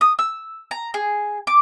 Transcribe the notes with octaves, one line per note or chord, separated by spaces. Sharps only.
D#6
E6
A#5
G#4
D6